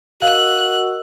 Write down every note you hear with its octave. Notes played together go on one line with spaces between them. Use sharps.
F#4 A#4 D#5 F5 E6 F#6